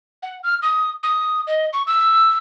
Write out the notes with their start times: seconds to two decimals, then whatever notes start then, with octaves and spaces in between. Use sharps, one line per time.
0.23 F#5
0.44 F6
0.62 D#6
1.03 D#6
1.47 D#5
1.73 C#6
1.87 E6